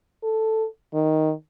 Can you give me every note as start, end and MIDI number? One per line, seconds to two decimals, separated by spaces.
0.23 0.66 69
0.94 1.33 51